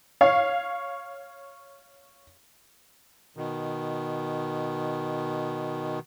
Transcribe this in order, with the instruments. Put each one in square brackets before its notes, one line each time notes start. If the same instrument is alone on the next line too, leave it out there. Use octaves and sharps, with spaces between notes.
[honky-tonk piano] C#5 F5
[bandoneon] B2 D#3